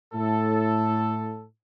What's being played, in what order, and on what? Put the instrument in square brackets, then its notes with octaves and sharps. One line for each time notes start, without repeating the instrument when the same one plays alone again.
[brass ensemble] A2 A4